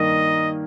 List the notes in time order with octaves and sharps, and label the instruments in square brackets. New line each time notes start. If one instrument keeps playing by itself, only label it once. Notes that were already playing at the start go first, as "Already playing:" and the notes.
Already playing: [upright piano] G2 D#3 A#3 [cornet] D#5